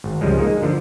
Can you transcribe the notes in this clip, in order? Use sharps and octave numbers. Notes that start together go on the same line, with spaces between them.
G#1
C#2 F3 G3 G#3
G#3 A#3 D#4
D3 F3